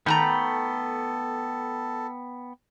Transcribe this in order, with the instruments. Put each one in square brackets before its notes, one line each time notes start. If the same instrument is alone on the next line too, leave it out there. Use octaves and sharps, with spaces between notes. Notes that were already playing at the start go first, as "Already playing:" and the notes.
[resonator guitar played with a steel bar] D#3 A3 A#5 [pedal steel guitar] B3 G5 B5 [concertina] A4